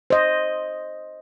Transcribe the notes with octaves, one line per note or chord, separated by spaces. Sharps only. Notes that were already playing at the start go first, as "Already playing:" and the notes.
C5 D#5